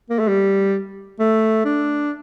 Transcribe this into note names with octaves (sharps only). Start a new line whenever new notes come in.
A#3
A3
G3
A3
D4